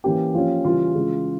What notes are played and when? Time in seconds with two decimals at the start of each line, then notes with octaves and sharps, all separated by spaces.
0.04 E3 A#3 C#4 G4
0.34 F3 A#3 C#4
0.65 C#3 E3 G3 C#4 F4
0.95 C#3 E3 G#3